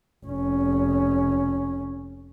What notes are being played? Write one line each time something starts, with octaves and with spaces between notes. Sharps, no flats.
F1 C#4